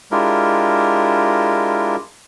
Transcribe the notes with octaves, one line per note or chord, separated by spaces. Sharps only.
G#3 D4 E4 F4 G4 A#4